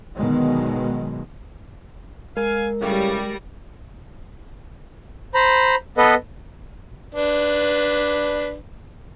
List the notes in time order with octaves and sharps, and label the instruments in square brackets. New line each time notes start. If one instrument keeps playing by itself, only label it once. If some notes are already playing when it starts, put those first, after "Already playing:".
[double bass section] B2 D3 D#3 F#3 G#3 B3
[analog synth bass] G#3 [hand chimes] A#4 [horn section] F5 G#5
[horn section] A2 C#3 [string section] G3 A#6
[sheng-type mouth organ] C5 A#5 B5
B3 A4 B4 D#5
[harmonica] D4 B4